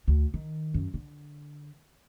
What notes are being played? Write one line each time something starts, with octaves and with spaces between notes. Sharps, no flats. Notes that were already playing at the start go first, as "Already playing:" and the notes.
D2
D#3
F#2
D3